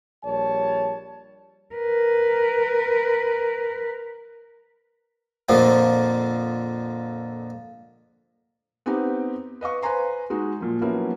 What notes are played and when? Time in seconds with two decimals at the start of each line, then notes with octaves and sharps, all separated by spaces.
0.24 A#1 G3 C#5 A5
1.75 A#4 B4
5.49 F2 A#2 D3 F3 A#3
8.86 B3 C4 D#4 G4
9.61 B4 D#5 F5 C#6
9.82 B4 C5 G#5 A#5 C6
10.30 G#3 D#4 F#4
10.60 A#2 F3
10.81 F3 F#3 A#3 B3 C#4 E4